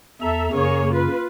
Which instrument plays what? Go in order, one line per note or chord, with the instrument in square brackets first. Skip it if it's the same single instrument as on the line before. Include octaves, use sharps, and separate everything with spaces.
[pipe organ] E2 A#5 [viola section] A4 E5
[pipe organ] F#2 C#3 [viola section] A#3 G#4 C#5
[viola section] F4 B4